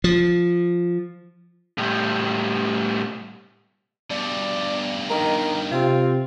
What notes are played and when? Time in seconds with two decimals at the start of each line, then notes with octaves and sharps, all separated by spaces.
0.04 F3
1.78 A2 G3
4.11 G2 B2 D5
5.10 D#3 A#4
5.71 C3 C4 F4